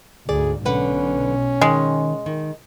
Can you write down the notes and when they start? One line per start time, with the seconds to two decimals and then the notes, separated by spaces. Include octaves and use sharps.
0.29 D2 G#2 G#4 D5
0.65 B1 D3 C#4 B4 F#5
1.61 D#3 G#3
2.26 D#3